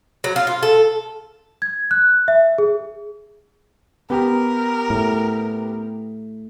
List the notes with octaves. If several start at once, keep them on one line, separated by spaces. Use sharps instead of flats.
F#3
F4
F4
A4
G#6
F#6
E5
G#4
B3 G4 A#4
A2